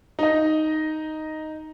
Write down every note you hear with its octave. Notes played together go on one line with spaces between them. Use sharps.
D#4 D#5